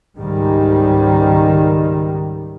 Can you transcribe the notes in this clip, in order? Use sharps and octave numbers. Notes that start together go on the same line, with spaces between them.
C#2 G#2 D#3 G3